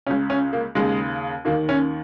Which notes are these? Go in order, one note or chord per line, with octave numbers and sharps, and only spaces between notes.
C#2 C#3 C#4
C#4
A#3
D#2 C#3 G#3
D#2 D#3 A#3
C#4